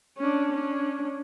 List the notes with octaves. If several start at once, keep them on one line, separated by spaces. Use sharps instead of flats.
C#4 D4
C#4 D4